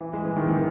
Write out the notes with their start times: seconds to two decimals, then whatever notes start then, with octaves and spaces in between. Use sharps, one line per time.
0.01 E3
0.13 G#3
0.25 E3
0.36 D#3
0.48 D#3